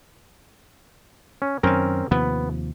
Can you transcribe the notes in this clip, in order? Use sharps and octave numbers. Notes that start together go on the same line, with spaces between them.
C#4
F#2 D#3 C4 C#4 A#4
D#2 C3 F3 B3